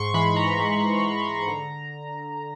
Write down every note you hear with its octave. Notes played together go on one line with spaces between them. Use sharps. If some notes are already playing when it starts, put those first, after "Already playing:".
Already playing: G#2 C6 C#6
E3 G#3 B5
A#5
G#2
E3 G#3
C6
B5
D3 A#5